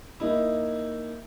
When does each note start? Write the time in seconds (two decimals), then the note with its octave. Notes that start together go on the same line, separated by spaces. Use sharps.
0.20 A#3 D#4 E4